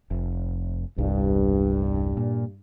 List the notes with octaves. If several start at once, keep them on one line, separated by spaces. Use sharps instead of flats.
F1
E1 C2 G2
A#2